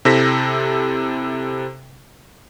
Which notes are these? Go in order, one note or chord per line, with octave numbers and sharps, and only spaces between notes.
C3 E4 A4 C5 A#6 B6